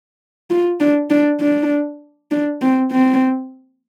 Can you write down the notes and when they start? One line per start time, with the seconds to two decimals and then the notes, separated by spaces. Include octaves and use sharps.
0.50 F4
0.80 D4
1.10 D4
1.41 D4
2.31 D4
2.62 C4
2.92 C4